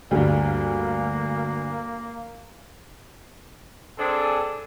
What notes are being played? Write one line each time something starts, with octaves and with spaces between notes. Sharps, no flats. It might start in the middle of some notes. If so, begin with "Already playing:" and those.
D2 G2 A#3
C4 D4 G#4 A4